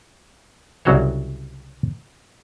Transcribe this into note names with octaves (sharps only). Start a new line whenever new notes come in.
C2 C#3 F#3 F#4 C5 C#5